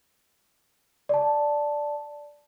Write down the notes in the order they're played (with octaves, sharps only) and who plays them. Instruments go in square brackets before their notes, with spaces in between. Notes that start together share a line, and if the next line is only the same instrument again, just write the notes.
[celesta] D5 A5